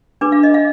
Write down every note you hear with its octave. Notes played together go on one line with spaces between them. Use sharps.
D4 G#4 B4 D6
F5
D#5
F5